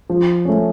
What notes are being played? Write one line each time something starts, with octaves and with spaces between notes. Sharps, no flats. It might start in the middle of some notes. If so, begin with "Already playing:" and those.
F3
A3 C#4